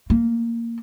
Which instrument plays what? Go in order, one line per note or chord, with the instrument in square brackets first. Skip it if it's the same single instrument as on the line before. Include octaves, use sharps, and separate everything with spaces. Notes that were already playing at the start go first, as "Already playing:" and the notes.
[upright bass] A#3